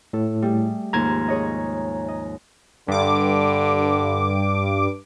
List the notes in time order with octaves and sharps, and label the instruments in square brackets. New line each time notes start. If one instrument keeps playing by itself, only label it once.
[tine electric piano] A2 [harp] A4
[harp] G3 A3 G#4
[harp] D#2 G#2 F3 [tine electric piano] A#5 G#6
[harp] G#4 C#5 D#5
D#5
[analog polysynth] G2 D6 [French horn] D3